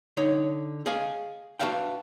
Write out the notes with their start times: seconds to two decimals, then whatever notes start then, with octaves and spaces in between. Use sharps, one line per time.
0.17 D3 D#4 C#5
0.86 G#4 D#5 F5 G#5
1.59 D4 F#4 B4 E5 F5 G5